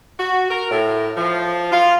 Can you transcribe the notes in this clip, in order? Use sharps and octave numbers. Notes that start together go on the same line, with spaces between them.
F#4
A#4
A2
F3
F4